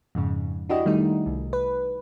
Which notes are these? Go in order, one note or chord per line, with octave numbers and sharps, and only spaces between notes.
F2 G#2 C#3
D4 E4 F#4 G4 D#5
D#3 G3 A3 D#4
C2
B4